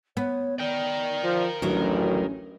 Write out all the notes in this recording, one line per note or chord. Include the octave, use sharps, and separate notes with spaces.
B3 C#5
A#4 D5 G5
F3
A1 D2 D#3 F#3 C#4